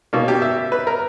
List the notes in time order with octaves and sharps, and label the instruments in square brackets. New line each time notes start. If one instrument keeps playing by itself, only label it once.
[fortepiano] B2 A#3 C#4
G4
E5
B4
A#4